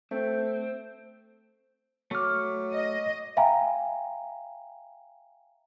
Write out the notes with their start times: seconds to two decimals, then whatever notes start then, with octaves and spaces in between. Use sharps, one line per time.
0.11 A3 C4
2.11 F#3 A3 C#6 D6 F6
2.73 D#5
3.37 E5 F5 G5 G#5 A#5 B5